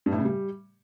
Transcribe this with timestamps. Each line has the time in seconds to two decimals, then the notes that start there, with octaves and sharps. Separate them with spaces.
0.06 G2
0.12 A2
0.19 C#3
0.25 G3